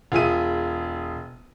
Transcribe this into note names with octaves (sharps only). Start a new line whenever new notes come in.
E1 F4 G#4 E5 D#7